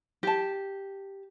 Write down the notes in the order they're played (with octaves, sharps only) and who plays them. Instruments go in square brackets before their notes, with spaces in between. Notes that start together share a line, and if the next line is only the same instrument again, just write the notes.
[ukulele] G4 A5